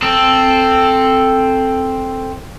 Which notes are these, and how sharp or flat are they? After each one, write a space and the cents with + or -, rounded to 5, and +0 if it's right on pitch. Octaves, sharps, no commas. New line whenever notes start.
C4 +0 A4 +0